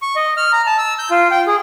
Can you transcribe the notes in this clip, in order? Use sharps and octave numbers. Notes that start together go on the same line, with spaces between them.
C#6
D#5
F6
A#5
A5
E6
G6
F4
G5
G#4